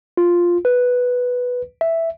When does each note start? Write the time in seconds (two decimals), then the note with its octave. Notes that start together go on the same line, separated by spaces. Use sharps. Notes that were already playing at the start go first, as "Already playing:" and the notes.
0.17 F4
0.65 B4
1.81 E5